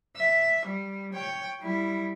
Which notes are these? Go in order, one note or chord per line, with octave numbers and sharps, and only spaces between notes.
E5
G3
C#5 G5
G3 E4